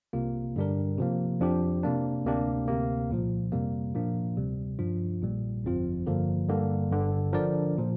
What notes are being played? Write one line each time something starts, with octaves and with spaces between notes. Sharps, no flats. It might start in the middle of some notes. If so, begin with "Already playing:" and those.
C2 C3 A#3 F4
G2 D3 G3 D4 A#4
C3 F3 A#3
F2 F3 D4 G4
C3 A#3 D4
D2 C3 A#3 D4 G4
D2 C3 A#3
C2 A#2 F3
F2 C3 G3 A#3
A#2 F3 A#3 D4
D2 C3 G3
G2 F3 D4 F4
A#1 A#2 G3
G1 F2 F3 C4 F4
G2 D3 F3 A#3
G2 D3 G3 A#3
G1 G2 D3
D3 F3 D4 A#4 D5
A#2 F3